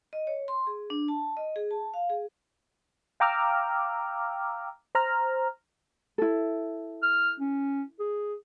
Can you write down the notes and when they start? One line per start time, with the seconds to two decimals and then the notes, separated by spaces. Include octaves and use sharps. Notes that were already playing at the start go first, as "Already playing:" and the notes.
0.13 D#5
0.27 C#5
0.48 C6
0.67 G#4
0.90 D4
1.08 A5
1.37 D#5
1.56 G#4
1.71 A5
1.94 F5
2.10 G#4
3.20 F5 G5 A#5 D6 E6 F6
4.95 C5 A#5 F6
6.18 E4 A4
7.03 F6
7.40 C#4
7.99 G#4